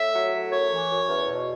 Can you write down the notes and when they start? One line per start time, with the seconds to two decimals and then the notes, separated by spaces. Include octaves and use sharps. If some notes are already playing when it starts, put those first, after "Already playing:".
Already playing: A2 E5
0.13 F#3
0.32 A2
0.51 F#2 C#5
0.71 E3
0.90 F#2
1.09 E2
1.28 B2